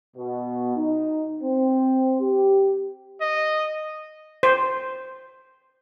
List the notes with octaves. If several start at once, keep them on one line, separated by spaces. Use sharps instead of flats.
B2
D#4
C4
G4
D#5
C5